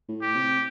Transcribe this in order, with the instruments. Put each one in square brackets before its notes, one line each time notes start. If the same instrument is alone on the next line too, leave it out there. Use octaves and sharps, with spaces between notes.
[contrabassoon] A2
[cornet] G4
[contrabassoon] C3